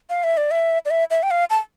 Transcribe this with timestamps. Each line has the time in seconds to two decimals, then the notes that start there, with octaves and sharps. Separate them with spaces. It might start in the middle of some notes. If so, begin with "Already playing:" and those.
0.10 F5
0.24 E5
0.37 D5
0.51 E5
0.85 D5
0.90 E5
1.10 E5
1.23 G5
1.31 F5
1.50 A5